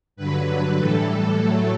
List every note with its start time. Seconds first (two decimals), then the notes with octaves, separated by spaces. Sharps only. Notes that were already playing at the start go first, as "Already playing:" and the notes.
0.16 G2 D3 F#3 B4
0.78 A2 E3 G3 A4
1.39 A2 F#3 A3 A4